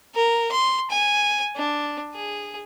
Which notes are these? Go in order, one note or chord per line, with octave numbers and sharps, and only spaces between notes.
A#4
C6
G#5
D4
G#4